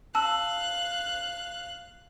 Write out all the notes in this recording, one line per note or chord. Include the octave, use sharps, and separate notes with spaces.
F5 A5 E6 F#6